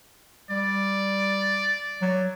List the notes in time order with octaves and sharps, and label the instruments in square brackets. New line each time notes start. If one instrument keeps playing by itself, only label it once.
[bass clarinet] G3 [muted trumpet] D5
[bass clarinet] F#3